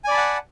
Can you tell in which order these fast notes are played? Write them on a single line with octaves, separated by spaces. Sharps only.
G#5 D5 B5 A5 F#5